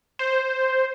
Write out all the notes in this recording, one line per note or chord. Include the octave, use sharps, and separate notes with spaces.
C5